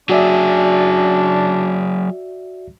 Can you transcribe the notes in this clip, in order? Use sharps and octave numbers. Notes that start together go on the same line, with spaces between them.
F#3 D4 F#4 G#4 D5 E5